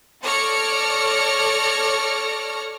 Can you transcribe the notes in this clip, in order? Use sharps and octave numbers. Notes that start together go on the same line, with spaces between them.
A4 C#5 D5 F6 A#6 C#7